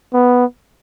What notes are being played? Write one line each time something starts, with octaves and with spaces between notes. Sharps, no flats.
B3